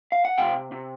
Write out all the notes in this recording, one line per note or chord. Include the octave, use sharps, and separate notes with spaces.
F5
F#5
C3 F5 G5
C3